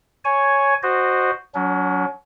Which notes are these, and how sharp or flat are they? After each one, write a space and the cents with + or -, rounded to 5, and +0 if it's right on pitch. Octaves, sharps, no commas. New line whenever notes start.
C#5 +0 G#5 +5
F#4 +0 C5 +0 D#5 -25
F#3 +0 C#4 +45